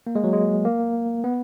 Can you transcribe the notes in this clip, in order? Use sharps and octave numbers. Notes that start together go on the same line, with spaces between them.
A#3
G#3
F#3
G#3
A#3
B3